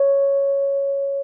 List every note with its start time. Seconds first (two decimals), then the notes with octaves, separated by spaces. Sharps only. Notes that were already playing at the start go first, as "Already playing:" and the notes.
Already playing: C#5